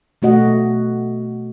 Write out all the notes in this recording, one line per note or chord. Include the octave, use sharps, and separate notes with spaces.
B2 A3 F#4 D#5 F#5